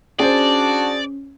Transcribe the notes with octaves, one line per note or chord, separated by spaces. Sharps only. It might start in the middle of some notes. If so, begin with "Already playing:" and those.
C#4 D4 F#4 G#4 C5 D5 A5